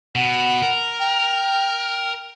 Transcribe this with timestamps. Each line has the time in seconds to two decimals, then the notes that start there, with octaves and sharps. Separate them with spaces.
0.15 B2 F#5
0.63 A#4
0.99 G5